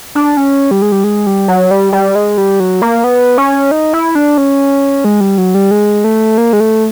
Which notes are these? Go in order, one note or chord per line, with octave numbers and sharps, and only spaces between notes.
D4
C#4
G3
G#3
G3
G#3
G3
F#3
G3
G3
G#3
G3
F#3
A#3
B3
C#4
D#4
E4
D4
C#4
G#3
G3
F#3
G3
G#3
A3
A#3
G#3
A3